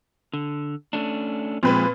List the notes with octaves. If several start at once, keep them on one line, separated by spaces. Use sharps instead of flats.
D3
A3 C#4 D4
A#2 F3 G#3 C4 B4